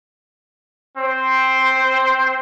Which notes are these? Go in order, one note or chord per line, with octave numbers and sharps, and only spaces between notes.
C4 C5